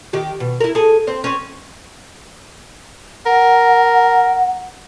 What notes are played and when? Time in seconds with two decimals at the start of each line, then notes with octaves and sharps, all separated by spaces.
0.13 D#3 G4
0.40 B2
0.60 E4 A#4
0.75 G#4 A4
1.07 C4 C5
1.24 C4 C#4
3.26 A#4 F#5